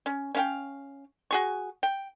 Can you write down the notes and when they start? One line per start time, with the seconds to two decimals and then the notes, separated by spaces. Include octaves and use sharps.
0.06 C#4
0.35 C#4 F5 G5
1.31 F#4 G#4 C#6
1.83 G5